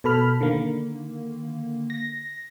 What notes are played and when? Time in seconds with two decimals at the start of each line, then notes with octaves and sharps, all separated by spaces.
0.04 B2 A4 B5 F6
0.41 D3 D#3 A#3
1.90 A#6